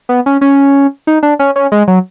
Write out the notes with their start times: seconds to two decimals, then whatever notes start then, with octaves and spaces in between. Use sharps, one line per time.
0.09 B3
0.26 C#4
0.41 C#4
1.07 D#4
1.23 D4
1.39 C#4
1.56 C#4
1.72 G#3
1.88 F#3